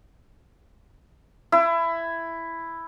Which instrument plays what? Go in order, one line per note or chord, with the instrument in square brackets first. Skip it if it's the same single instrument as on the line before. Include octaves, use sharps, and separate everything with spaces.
[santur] E4